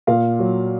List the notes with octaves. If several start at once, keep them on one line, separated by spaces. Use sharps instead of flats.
A#2 F5
F#3